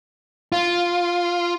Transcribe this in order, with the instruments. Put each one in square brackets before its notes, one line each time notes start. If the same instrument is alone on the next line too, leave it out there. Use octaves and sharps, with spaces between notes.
[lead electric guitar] F4